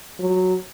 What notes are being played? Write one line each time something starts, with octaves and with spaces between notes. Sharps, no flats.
F#3